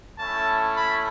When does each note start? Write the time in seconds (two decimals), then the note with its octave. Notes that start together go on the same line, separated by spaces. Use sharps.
0.19 A3 C#4 E4 A5
0.75 B5